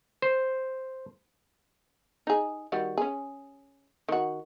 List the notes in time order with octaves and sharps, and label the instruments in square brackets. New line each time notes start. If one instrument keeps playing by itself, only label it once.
[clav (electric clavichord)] C5
[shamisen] D#4 G#4
D#3 G3 F#4
C#4 G#4
D#3 F#4